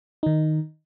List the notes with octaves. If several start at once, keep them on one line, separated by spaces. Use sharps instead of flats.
D#3 D#4